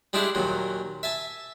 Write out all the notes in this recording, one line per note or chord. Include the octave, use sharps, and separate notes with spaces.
G3 G#3 D4 E4 G4 G#4
D#2 A#2 F#3
E5 G#5 A5